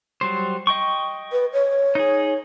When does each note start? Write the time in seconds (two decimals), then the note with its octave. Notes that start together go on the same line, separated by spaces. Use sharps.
0.21 F#3 G3 C5
0.67 D#5 G5 C#6
1.32 B4
1.53 C#5
1.95 D#4 G#4